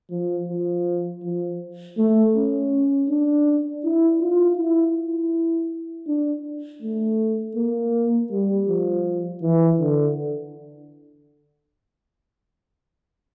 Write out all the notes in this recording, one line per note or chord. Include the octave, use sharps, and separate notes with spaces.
F3
F3
F3
A3
C#4
D4
E4
F4
E4
E4
D4
A3
A#3
G3
F3
E3
D3